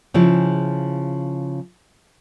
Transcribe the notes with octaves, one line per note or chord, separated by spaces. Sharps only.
C#3 F3 E4 G#4